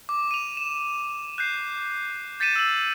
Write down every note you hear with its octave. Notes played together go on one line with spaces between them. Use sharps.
D6
D#7 F7
E7
F#6 G6 C7
G6 A6 B6 C#7 D#7 E7
E6 F#7